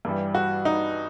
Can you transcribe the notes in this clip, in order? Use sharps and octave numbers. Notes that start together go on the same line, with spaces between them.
G2 E3 G3
F#4
D#4